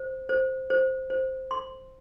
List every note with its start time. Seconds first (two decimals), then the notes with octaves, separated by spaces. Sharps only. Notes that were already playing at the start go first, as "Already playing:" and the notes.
Already playing: C5
0.29 C5
0.70 C5
1.10 C5
1.51 C6